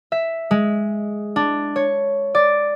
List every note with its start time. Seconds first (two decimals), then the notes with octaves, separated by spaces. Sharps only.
0.12 E5
0.51 G#3
1.36 D4
1.76 C#5
2.35 D5